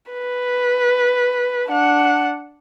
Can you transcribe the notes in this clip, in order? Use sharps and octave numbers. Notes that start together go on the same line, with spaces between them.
B4
D4 F#5